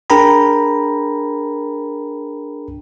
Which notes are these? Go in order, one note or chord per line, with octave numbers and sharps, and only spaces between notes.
D4 G#4 A#4 G5 A#5 B5